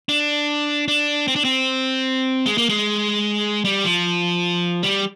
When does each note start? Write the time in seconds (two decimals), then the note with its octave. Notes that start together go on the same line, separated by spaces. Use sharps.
0.09 D4
0.88 D4
1.28 C4
1.36 D4
1.45 C4
2.46 G#3
2.58 A#3
2.69 G#3
3.65 G3
3.85 F3
4.83 G3